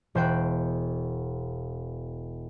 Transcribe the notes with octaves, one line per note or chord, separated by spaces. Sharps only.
E1 C5 G5 F#6